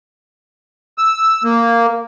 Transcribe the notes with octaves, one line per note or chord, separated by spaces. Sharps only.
E6
A#3